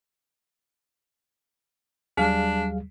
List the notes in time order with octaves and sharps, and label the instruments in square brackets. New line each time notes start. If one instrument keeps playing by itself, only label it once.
[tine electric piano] D#2 F#3 G3 [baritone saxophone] D4 [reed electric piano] G#4 F5